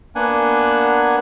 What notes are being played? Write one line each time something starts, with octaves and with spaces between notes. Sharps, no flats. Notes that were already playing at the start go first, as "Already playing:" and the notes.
A#3 B3 D4 F#5 G#5